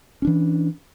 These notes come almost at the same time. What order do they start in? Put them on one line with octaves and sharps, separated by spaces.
C#4 D4 E3